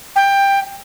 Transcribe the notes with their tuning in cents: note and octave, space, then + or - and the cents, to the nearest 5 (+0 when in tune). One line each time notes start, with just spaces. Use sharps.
G5 +15